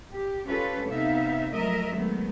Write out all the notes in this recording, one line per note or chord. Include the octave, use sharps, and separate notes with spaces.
G4
C#4 F4 G4 A4 B4
C3 B3 D#4 E5 F5
F3 F#3 A3 A#4 D#5 E5
D#3 F#3 G#3 A3 B3